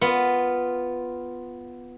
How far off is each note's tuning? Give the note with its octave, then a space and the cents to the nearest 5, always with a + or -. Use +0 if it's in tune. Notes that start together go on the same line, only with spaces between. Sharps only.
B3 +0 F4 +0